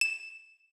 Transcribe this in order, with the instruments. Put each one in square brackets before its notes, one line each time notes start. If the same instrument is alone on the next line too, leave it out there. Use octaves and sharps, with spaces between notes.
[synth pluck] E7